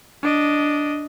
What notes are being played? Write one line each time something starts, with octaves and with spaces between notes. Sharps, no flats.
D4 D#5